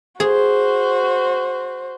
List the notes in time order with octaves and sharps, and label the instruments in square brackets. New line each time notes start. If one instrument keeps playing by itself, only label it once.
[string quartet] F#4 C5 [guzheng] G#4